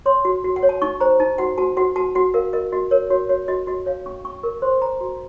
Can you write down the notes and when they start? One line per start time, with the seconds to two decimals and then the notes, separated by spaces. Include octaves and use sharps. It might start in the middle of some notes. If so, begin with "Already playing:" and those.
0.06 C#5 C6
0.25 F#4
0.44 F#4
0.56 F#5
0.63 C#5
0.69 A5
0.82 D#4 C#6
1.00 C5 A#5
1.20 D#4 A5
1.38 F#4 F#5
1.58 F#4 A5
1.77 F#4 F#5
1.96 F#4 A5
2.15 F#4 F#5
2.34 A#4 F5
2.53 A#4 D#5
2.72 F#4 D#5
2.91 A#4 C#5
3.10 F#4 C#5
3.29 F#4 C#5
3.48 F#4 D#5
3.67 F#4 D#5
3.86 C#5 F5
4.06 C#4 C#6
4.24 C#4 C#6
4.43 A#4 C#6
4.62 C5 C6
4.81 C5 A#5
5.01 F#4